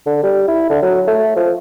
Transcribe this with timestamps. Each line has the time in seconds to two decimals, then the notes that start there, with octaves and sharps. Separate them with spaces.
0.06 D3
0.23 G3
0.47 E4
0.70 D3
0.82 F#3
1.07 A3
1.36 F3